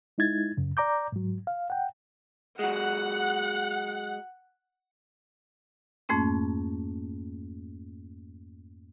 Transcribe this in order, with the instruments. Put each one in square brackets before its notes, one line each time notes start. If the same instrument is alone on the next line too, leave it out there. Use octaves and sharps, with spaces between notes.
[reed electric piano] G#3 D#4 E4 G#6 A6
F#2 C#3
D5 A#5 D6 G6
G#2 F#3
F5
F#5 G5
[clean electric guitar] F#3 G#3 [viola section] F#5
[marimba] F2 G#2 A3 A#3 C#4